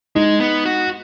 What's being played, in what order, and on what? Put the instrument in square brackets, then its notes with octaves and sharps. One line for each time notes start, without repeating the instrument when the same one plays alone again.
[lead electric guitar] G#3 [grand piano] D#4
[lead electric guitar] B3
F#4